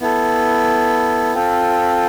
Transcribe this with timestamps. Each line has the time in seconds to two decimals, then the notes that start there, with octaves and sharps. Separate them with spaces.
0.01 B3 E4 A4
1.34 C4 F4 A4